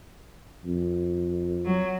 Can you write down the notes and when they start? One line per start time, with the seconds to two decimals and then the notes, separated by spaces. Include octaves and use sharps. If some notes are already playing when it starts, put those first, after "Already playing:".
0.65 F2
1.65 F#3